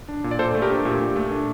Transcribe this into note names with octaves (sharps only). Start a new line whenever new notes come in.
D4
A#2
D5
A#2 A4 C5
A3
G4 A#4
D4
A#2 G4
A#2
A3
D4